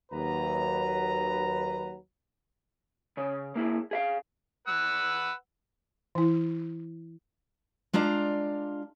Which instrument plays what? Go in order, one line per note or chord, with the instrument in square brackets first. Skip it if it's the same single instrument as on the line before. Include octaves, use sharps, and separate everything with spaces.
[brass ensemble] D#2 F#3 B4 A#5
[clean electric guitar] C#3 C#5
A#3 E4 G#4
G#4 E5 F5
[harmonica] B4 F#5 E6
[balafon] E3 E4
[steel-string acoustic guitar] G#3 D4 F4 D5 A#5